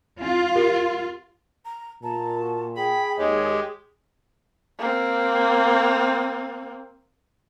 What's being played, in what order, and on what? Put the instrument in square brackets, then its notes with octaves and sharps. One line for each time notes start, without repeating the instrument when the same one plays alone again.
[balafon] C4 E4 [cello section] F4
[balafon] G4 A#4
[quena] A#5
[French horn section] A#2 [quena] A5 [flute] A#5
[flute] F#4
[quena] G#4 [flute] G5 [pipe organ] B5
[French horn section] D#2 D#5 [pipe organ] G#3 G4 [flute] C#5
[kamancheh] A#3 C4